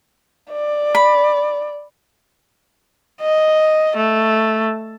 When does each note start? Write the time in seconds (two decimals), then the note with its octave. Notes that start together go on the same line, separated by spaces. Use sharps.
0.52 D5
0.95 B5
3.21 D#5
3.97 A3